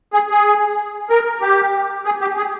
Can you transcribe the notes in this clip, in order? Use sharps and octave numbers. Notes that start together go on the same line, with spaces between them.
G#4
G#4
A#4
G4
G#4
G4
G#4